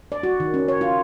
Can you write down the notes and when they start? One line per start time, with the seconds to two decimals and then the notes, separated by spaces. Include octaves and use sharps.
0.12 D5
0.23 F#4
0.40 D#3
0.54 C#4
0.68 C#5
0.81 F4